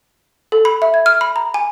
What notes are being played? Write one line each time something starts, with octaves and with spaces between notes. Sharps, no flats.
A4
B5
E5
G#6
F6
B5
A#5
G#5